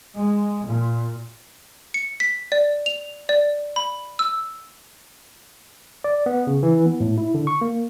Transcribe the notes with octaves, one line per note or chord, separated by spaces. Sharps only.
G#3
A#2
C#7
B6
D5
F7
D5
B5
E6
D5
B3
C#3
E3
B3
A2
E4
D3
C#6
A#3